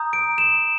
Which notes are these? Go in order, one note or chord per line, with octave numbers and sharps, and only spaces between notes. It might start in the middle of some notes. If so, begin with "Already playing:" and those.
Already playing: A#5 D#6 G6
D7
E7